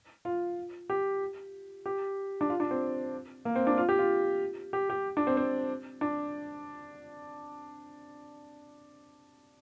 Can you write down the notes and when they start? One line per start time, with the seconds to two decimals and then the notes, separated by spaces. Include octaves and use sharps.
0.25 F4
0.90 G4
1.86 G4
2.41 D4
2.50 F4
2.60 D4
2.71 C4
3.45 A#3
3.56 C4
3.67 D4
3.78 F4
3.89 G4
3.99 F4
4.73 G4
4.90 G4
5.17 D4
5.27 C4
5.37 C4
6.01 D4